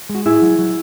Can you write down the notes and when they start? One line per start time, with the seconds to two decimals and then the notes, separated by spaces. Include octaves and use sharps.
0.09 G#3
0.15 F#4
0.26 A2 E4 G#4
0.42 F#3
0.59 F#3